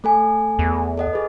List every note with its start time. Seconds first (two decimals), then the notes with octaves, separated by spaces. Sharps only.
0.04 A3 A4 G#5
0.59 E2
0.98 A4 D#5 F#5
1.13 G#4 B4